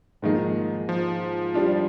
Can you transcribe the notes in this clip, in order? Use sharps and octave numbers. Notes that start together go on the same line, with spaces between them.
G#2 D#3 F3 A#3 D#4 G#4
F3
G3 D4 F4